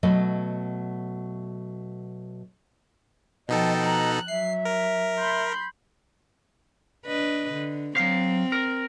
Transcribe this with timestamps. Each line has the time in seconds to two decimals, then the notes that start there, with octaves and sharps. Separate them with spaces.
0.03 B2 F#3 A3 D#5
3.49 B2 F3 D#4 A4 D#5 G5 A5
3.83 A#5 F#6
4.28 F#3 E5 C7
4.65 A#4
5.17 B5 C6 G6
7.06 D4 B4 D#5
7.52 D3
7.97 F#3 C4 F5
8.52 A#4